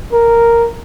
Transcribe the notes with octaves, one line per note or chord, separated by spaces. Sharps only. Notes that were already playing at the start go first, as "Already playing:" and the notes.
A#4